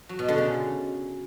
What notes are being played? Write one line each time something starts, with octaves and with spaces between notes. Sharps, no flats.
F#3
B2
D3
C#3